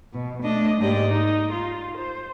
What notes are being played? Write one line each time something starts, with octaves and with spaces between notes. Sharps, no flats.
B2
A3 D4 D#5
G#2 G#3 A#3 G4 D5 D#5
D#4
F4
C5